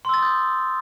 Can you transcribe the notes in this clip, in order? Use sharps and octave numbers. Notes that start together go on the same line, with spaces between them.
C6 D#6 E6 G6 A6